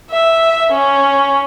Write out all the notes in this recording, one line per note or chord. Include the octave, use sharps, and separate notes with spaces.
E5
C#4